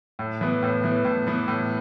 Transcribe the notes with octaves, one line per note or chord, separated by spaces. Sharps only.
A2
E3 B3
A2
E3 B3
A2
E3 B3
A2